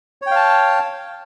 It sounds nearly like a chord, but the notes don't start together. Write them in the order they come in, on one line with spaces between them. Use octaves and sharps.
C#5 G5 F5 A5